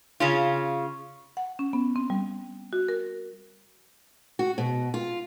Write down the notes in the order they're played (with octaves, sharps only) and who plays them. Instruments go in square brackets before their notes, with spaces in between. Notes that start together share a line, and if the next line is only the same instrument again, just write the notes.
[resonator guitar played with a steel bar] C#3 C#4 F4
[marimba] F#5
C#4
B3
C4
G3
F#4
A#4
[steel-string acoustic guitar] F#4
B2
F4